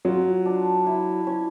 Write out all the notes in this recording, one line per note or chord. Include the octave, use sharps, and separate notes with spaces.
F#3 F4
D4
E4
C#4